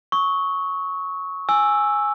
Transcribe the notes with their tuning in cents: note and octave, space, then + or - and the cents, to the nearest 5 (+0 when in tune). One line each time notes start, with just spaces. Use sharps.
C#6 +0 E6 -45
G#5 +0 E6 +0